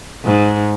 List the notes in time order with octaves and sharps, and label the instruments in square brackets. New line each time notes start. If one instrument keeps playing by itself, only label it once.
[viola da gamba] G#2